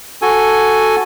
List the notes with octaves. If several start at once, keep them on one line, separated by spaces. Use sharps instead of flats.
F#4 A4 G#5